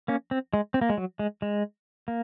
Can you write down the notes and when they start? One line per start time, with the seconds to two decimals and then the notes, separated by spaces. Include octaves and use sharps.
0.08 A#3 C#4
0.31 C4
0.53 G#3
0.74 C4
0.81 A#3
0.89 G#3
0.97 F#3
1.19 G#3
1.42 G#3
2.08 A#3